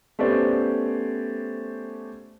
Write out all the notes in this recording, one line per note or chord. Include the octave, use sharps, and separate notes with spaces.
A3 B3 C#4 G4 C5 D5